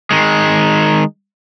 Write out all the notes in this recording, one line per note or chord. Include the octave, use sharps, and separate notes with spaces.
D#3 G#3